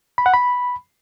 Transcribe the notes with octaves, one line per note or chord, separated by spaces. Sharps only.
B5
F#5
B5